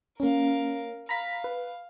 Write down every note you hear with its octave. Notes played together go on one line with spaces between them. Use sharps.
A#3 C#4 A#4 F5
F5 A#5 B5 B6
B4